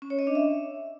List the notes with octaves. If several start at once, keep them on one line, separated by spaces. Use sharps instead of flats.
C#4
C#5
D#5
D4
E5